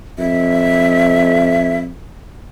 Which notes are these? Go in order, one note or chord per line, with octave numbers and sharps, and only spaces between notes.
F2 E5